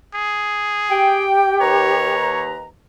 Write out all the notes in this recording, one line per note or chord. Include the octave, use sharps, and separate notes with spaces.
G#4
G4 G5
D#2 B4 C#5 A#5